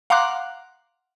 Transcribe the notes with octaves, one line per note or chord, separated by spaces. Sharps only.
F5 F#5 A#5 C6 D6 F#6